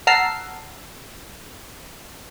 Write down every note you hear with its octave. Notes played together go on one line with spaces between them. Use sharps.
F#5 A5 A#5 E6 F6 C7